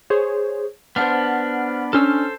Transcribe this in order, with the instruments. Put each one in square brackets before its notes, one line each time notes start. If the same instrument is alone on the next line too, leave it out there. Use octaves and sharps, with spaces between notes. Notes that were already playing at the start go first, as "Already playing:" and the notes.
[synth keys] G#4 C5 C#5
[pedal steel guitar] B3 D4 [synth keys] C5 F#5 F6
[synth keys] C#4 D4 F6 [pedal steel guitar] A4 C5 E6